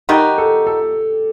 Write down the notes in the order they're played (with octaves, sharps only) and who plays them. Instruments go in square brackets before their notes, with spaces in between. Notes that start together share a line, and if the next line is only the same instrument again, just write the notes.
[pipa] D#3 G3 D#4 F#4 [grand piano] G4
[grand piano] A4
A4